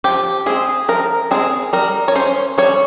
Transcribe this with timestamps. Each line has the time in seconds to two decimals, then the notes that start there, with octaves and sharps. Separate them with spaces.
0.04 F3 G4
0.46 G#3 C4 G#4
0.88 F3 A#4
1.31 G#3 C4 G#4
1.73 G3 A#4
2.08 C#5
2.15 C#4 C5
2.58 G3 C#5